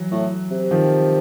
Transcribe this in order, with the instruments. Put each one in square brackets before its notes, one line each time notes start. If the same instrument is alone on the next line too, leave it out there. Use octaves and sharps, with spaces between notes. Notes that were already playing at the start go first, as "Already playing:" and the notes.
Already playing: [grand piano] E3 F#3
[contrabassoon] A2
C3
[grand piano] D#3 F3